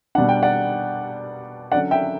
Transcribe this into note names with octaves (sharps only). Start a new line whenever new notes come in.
B2 G3 D4 F#5
G5
D5 F#5
D3 F#3 C#4 D5 F#5
E5 G5